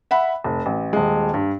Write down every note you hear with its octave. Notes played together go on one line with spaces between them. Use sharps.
E5 F#5 B5
F1
A1
D#1 G#3
G2